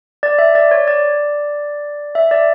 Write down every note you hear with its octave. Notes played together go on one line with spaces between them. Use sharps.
D5
E5
D5
C#5
D5
E5
D5